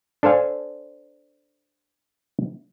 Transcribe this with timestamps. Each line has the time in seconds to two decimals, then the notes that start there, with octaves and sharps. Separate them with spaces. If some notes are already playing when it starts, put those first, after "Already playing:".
0.23 D4 A4 C5 F5 G#5